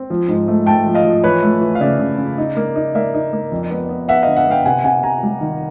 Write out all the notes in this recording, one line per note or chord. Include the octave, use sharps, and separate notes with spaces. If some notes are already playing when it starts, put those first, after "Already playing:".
Already playing: C4
F3
G#2
A3
A3 G5 A5
F3
D#5 F5
F3
E3 B4 C#5
A3
E3
F5
C#3 D5 E5
C#3
C#3
D#4
A#3
D#4
A#3 D5 E5
D#4
A#3
F2
B3
B3
B3 E5 F#5
D3 D#5 F5
E5 F#5
B3 F5 G5
C3 F#5 G#5
C3 F#5 G#5
C3 G#5 A#5
G3
D#3